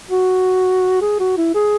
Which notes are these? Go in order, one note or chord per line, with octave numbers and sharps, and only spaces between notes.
F#4
G#4
F#4
E4
G#4